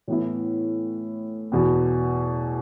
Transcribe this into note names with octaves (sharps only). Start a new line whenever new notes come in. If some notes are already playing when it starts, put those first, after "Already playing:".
A2 E3 B3 E4
E2 B2 B3